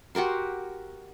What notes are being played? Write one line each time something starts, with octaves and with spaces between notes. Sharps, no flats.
F#4 G4 A#4 C6